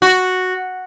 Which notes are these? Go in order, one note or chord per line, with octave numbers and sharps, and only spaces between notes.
F#4